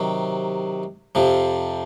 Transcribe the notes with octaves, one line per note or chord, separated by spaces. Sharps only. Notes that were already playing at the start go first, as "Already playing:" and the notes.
Already playing: C3 D#3 F#3
F2 C3 F3